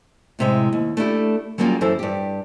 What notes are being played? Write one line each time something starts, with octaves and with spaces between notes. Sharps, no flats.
A2 C3 G#3
D#2
A3 D4 E4 G4
F#3 G3 A#3 C#4 F4 G#4
F#2 E3 A4 C5
G2 G4